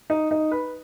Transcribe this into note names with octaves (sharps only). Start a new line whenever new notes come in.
D#4
D#4
B4